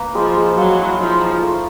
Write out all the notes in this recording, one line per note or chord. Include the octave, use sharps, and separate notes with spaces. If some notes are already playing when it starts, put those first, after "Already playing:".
Already playing: A#3 B4
F3 G#3
G#3
F#3 F5
E4
F3 D#4
D#4
A3